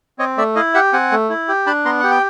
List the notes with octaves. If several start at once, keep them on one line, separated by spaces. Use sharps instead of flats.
C4 C#5 D#5
A3 D5 E5
E4 D#5 F5
G4 E5 F#5
C4 F#5 G#5
A3
E4
G4
D4 A5 B5
B3 A#5 C6
G4 F#5
G5